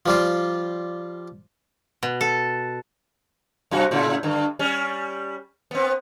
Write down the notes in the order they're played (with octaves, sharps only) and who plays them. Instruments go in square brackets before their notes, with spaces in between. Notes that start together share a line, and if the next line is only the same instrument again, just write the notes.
[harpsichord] F3 G3 F4
[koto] B2
A4
[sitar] F#2 C3 F#4
A2 C#3 E4
G2 D3
G3 C#4
B3 C4